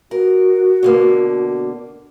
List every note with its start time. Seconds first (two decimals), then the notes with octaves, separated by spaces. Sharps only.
0.11 F#4 A#4
0.83 B2 D3 A#3